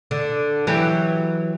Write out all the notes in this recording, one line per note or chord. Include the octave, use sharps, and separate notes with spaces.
D3
E3 F#3 G4